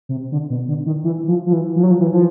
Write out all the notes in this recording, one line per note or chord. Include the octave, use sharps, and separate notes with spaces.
C3
D3
B2
D3
D#3
E3
F3
F3
E3
F3
F#3
F3
E3
F3